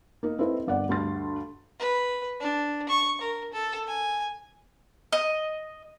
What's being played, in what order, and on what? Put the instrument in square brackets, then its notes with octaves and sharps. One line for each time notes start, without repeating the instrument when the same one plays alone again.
[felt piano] A#3 D#4
C4 D#4 E4 A4 B4
G1 D5 F#5
D2 G2 C6 A6
[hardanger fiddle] B4
D4
C#6
A#4
A4
G#5
[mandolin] D#5